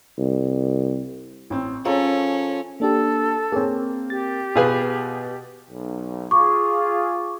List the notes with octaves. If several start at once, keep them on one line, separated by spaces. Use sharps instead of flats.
C2
A1 C4
F3 C#4 G#4 A4 C#5 A#5
A#3 D4 G4 A4
A#3 C4 G#4 C#5
G4 A6
B2 F4 G#4 B4
B1
F4 G#4 C#6 D6